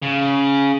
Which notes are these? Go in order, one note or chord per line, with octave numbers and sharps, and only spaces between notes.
C#3